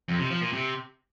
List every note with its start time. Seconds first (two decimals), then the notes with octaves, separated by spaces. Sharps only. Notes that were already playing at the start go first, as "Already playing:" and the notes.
0.08 F2
0.20 C3
0.31 F3
0.42 A#2
0.53 C3